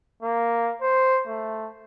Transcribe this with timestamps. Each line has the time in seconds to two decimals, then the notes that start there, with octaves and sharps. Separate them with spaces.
0.22 A#3
0.81 C5
1.27 A3